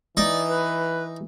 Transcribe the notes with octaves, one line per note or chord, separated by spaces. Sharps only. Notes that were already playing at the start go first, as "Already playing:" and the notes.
E3 D#4 D5
B4